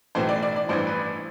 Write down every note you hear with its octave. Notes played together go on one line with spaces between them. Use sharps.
B1 A2 E3 C5
D5
D5
D5
A1 G2 E3 C5
B4